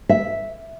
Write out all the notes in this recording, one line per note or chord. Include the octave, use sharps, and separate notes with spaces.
E5